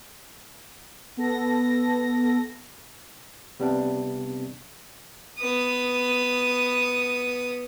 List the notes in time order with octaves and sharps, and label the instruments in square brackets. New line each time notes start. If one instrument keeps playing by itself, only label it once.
[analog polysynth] B3 A4 A#6
[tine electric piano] C3 G3 B3 C4 D4
[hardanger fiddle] B3 D#6